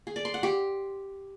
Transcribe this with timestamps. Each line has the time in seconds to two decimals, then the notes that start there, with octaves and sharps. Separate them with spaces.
0.07 G#4
0.16 D5
0.25 C6
0.34 F#5
0.43 G4